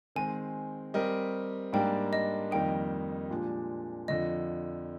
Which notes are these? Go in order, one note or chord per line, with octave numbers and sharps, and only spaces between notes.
D#3 G#3 C4 G#5
G3 C4 G4 A#4 D#5
G#2 G3 A#3 D4 G5
D#5
F2 D#3 G3 A#3 D#4 G5
A#2 F3 G#3 D4 G4
F2 D3 F3 D#5